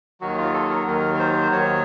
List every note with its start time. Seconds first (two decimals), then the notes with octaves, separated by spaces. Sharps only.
0.21 D#2 D#3 F#3 F#4
0.37 F4
0.54 A4
0.70 A#4
0.86 D#2 D#3 F#3 A#4
1.14 A#4
1.19 C5
1.52 D#2 D#3 F#3 C#5